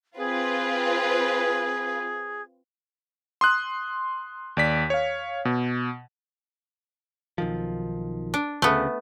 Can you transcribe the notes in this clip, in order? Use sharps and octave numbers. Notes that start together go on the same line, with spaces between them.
C4 F4 G#4 B4
C6 D#6 F#6
D#2 D5 B6
C#5 F5
B2
B1 D#3 F3
D4
D2 C#3 A3 B3